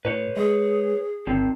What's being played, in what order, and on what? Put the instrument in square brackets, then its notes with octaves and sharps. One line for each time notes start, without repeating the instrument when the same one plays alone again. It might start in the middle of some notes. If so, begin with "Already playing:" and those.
[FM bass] A2 [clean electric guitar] B4 C#5
[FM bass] G#3 [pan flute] G#4
[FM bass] G1 [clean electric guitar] D#3 C4